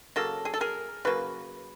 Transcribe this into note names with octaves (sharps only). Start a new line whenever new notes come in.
C#3 F#3 A#3 A4
G#4
A4
G#4 A#4
C#3 F#3 A#3 B4